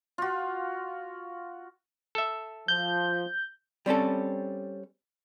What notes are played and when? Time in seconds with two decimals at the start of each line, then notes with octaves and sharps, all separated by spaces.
0.18 F4 F#4
2.15 A4 E5
2.68 F3 G6
3.86 G3 C4 C#4 A4